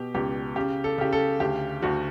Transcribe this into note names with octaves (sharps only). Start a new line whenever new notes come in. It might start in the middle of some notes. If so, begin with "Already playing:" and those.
Already playing: B2 G4
C#2 G4
C#3 G4
A4
C#3 G4
A4
D2 G4
D2 F#4